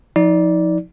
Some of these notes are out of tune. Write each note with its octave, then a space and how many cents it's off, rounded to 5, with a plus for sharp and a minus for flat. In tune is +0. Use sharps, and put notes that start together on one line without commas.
F3 +10 D#4 +35 D5 -10